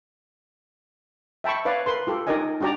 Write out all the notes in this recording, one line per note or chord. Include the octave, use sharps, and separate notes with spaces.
E5 G5 A5 B5 C#6
B4 C#5 D5 F5
A#4 B4 C6
F4 G4 A4
D#4 G4 A#4 D5 D#5 G#5
D4 F#4 G4 D5 A#5